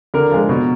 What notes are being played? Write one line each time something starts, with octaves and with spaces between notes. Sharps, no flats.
D3 A#4
F3 G#3
B2